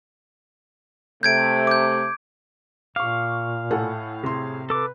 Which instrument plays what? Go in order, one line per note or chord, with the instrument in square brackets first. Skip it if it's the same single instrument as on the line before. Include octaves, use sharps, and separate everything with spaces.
[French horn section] C3 A3 [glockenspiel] G6 G#6 D7
[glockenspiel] D6 G6
[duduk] A#2 [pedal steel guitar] F5 [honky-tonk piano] C#6 D6
[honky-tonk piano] A2 [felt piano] A4 F#5 G#5
[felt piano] C3 C6 [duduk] G#4
[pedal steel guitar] A4 D6 [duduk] B4